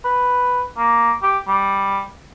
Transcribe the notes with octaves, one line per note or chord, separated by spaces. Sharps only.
B4
A#3
G4
G3